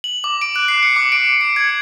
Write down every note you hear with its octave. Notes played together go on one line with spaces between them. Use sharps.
F#7
D6
D7
F#6
C7
C#7
D6
D7
C#7
G#6